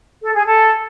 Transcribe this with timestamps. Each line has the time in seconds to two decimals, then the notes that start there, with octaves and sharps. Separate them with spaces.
0.22 A4
0.34 G#4
0.46 A4